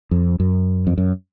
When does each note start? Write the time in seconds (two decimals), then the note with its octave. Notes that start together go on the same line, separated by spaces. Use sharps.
0.11 F2
0.40 F#2
0.87 F2
0.98 F#2